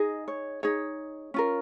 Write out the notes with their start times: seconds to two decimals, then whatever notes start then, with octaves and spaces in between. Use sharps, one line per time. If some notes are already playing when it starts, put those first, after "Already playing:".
Already playing: D#4 G#4 D#5
0.28 C#5
0.63 D#4 G#4 C#5
1.34 C#4 F4 A#4